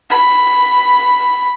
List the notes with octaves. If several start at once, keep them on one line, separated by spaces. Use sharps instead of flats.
B5